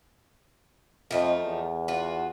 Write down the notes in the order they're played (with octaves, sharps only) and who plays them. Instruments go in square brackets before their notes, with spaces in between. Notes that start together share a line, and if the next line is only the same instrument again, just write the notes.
[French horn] F2 [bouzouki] F3 A3 D#4
[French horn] E2
[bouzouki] F4 F#4